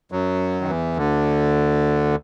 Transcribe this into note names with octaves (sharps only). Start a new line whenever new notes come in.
F#2 F#3
D#3
E2 E3
D2 D3